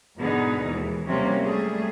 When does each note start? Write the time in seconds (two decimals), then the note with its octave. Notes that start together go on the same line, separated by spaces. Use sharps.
0.18 G#2 B2 D3 B3 D#4 G#4
0.66 D#2 E3 G#3
1.09 C3 F#3 G3 A#3 C4 C#4
1.44 G3 A3 G#4